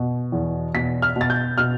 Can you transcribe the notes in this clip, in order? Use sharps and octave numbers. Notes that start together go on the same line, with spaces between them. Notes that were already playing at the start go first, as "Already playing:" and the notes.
Already playing: B2
E2
B2 B6
F6
B2
A6
G6
B2 F6